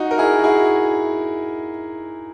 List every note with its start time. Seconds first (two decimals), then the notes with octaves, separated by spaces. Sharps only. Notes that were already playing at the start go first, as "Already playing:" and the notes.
Already playing: D#4 F#4
0.11 A#4
0.18 E4 G#4
0.39 F#4
0.44 E4 G#4